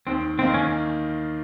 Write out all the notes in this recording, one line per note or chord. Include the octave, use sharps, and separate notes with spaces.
D#2 C4
D#3 A#3 C4 D#4
C#4